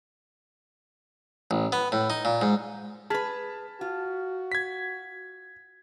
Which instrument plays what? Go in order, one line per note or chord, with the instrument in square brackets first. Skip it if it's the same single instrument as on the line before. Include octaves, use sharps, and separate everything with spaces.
[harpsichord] A1
B3
A2
D#4
A#2
G#2
[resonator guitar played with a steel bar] G#4 B4 [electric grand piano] A5 F6 B6
[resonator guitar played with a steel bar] F4 [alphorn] F#4
[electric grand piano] G#6 B6